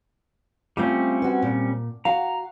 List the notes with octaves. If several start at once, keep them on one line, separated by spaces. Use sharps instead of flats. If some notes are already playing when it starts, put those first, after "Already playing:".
G3 A3 C4 C#4 F4 F5
F#4 B4
A#2
F#4 F5 A#5